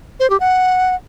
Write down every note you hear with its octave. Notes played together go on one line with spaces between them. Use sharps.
C5
G4
F#5